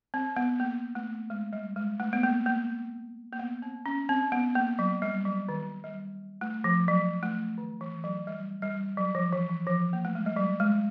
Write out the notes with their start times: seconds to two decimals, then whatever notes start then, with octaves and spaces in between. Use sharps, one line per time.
0.14 C4
0.36 B3
0.60 A#3
0.95 A3
1.30 G#3
1.53 G3
1.76 G#3
2.00 A3
2.13 B3
2.23 A#3
2.46 A#3
3.33 A#3
3.39 B3
3.62 C4
3.86 C#4
4.09 C4
4.32 B3
4.55 A#3
4.79 F#3
5.02 G3
5.25 F#3
5.49 D#3
5.84 G3
6.41 A3
6.64 F3
6.88 F#3
7.23 A3
7.58 D#3
7.81 E3
8.04 F#3
8.27 G3
8.62 G3
8.97 F#3
9.15 F3
9.33 E3
9.49 E3
9.67 F3
9.93 A#3
10.05 A3
10.15 G#3
10.26 G3
10.36 F#3
10.60 G#3